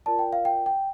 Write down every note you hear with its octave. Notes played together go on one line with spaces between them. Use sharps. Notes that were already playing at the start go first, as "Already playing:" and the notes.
F4 A#4 D5 A5
G5
F5
G5
G5